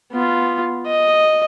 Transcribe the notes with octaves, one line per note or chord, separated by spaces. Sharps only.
B3 F4
D#5